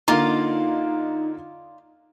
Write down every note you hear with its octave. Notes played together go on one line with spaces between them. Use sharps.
D3 A#3 D#4 F4 D5 A#5